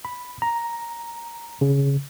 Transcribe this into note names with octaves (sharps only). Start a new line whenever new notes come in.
B5
A#5
C#3